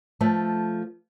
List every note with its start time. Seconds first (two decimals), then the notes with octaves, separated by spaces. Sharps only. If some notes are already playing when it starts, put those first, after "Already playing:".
0.21 F3 A3 A4